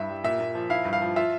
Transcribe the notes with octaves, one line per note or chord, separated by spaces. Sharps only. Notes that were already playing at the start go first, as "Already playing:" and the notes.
Already playing: G2 E4 E5
G3
A#2 E5
A#2
F3
E4 F5
G2
F5
F3
F4 E5